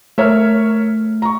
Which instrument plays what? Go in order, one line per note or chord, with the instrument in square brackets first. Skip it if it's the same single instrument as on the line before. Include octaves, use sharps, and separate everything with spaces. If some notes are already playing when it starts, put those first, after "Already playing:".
[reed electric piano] A3 F6 [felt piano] A#4 C#5 E5
[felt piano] A#5 C#6